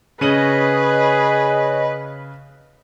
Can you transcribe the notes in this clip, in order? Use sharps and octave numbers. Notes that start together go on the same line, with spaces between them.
C#3 G#4 B4 C#5 D#5 D#7 F#7